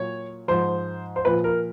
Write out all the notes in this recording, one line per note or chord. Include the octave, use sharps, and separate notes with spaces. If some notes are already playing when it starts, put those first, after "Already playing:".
Already playing: A#2 F#3 C#5
G#2 F3 C5
C5
A#2 F3 B4
A#4